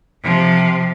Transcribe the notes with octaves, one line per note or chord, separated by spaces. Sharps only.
C3 F3